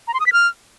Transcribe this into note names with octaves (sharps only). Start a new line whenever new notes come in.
A#5
C6
D#6
B6
F6